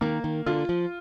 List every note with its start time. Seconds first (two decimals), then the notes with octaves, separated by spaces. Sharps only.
0.01 D#3 A#3
0.24 D#3
0.46 D3 F4
0.69 F3